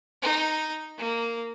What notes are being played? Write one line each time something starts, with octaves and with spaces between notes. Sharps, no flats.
D#4
A#3